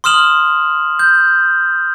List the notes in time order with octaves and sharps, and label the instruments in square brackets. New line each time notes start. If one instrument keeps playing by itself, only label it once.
[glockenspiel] C6 D#6 F6 E7 F#7
G6